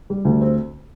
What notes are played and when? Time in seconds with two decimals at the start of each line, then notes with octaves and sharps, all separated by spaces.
0.10 G3
0.25 D2
0.41 C4